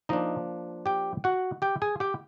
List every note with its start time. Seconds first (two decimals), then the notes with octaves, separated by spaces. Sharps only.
0.09 F3 A#3 D4 D#4 D#5
0.86 G4 G5
1.24 F#4 F#5
1.62 G4 G5
1.82 G#4 G#5
2.00 G4 G5